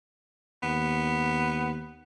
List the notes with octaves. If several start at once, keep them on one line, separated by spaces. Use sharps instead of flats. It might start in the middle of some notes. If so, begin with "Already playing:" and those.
D#2 B3